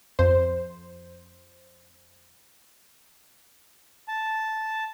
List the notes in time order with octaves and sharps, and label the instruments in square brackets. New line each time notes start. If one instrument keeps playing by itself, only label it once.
[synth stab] F2 C5
[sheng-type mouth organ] A5